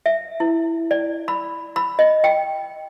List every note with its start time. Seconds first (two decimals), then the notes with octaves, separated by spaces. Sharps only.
0.06 E5
0.40 E4
0.91 D5
1.28 B5
1.76 B5
1.99 D#5
2.24 G5